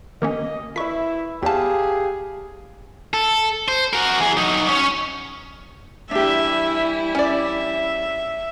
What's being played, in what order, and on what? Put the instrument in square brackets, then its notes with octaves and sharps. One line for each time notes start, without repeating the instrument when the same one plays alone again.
[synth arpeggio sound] D#3 A#3 C#4 [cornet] D#5
[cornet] E4 [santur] B4 E5 [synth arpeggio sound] C#6 B6
[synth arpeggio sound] E2 A5 [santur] G4 F5 [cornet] G#4
[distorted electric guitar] A4
C5
F#4 A#4
E3 G#4
F#3 D#4
C#4 C#5
[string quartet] E3 G3 E4 [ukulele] D4 G4 [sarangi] E5
[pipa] C#4 D5 [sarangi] E5